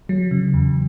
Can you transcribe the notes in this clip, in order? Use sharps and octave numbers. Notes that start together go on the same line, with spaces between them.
F#3
C#3
E2